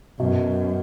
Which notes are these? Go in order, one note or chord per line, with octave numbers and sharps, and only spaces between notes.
F#2 B2